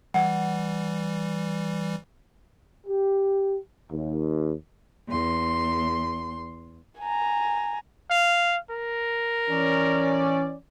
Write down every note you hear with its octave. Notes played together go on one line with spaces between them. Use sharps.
E3 G3 F#5
G4
D#2
E2 C6
G#5 A#5
F5
A#4
E3 C#4 D5